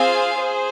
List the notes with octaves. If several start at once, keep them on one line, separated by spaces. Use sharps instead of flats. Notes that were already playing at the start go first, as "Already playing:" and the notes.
Already playing: C4 F4 G#4 C5 F5 G#5
G#4 C5